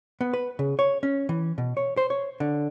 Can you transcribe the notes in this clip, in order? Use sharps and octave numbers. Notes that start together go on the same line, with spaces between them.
B3
B4
C#3
C#5
C#4
E3
B2
C#5
C5
C#5
D3